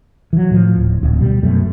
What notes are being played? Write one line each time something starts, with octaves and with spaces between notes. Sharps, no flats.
E3 F#3
A2 F3
D1
D1
B2 G3
F#2 B2 A3